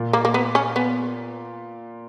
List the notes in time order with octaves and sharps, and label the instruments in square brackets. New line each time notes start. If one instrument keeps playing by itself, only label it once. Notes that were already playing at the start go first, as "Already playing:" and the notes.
Already playing: [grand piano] A#2
[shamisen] A#3
A#3
B3
C#4
B3